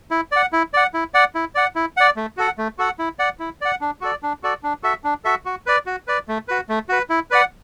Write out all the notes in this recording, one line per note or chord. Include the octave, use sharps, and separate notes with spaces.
E4
D5 F#5
E4
D5 F#5
E4
D5 F#5
E4
D5 F#5
E4
D5 F#5
A3
F#4 A4 F#5
A3
F#4 A4 F#5
E4
D5 F#5
E4
D5 F#5
D4
F#4 A4 D5
D4
F#4 A4 D5
D4
F#4 A4 E5
D4
F#4 A4 E5
F#4
B4 D5
F#4
B4 D5
A3
F#4 B4
A3
F#4 B4
E4
B4 D5 F#5